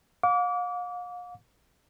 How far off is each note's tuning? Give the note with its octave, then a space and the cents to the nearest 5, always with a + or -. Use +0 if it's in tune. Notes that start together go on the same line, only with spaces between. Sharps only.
F5 +40 D6 -30